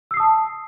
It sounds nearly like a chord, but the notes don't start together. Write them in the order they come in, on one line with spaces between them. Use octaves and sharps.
E6 C7 D#6 A5